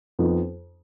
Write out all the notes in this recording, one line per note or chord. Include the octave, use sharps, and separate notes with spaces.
F2 F3 B3 D#4